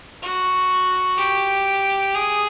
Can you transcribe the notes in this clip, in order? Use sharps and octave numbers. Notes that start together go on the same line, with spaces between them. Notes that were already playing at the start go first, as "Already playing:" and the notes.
F#4
G4
G#4